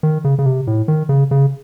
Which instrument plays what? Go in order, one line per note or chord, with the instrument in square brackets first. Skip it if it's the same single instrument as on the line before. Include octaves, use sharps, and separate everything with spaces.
[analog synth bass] D#3
C#3
C#3
C3
A2
D#3
C#3
C#3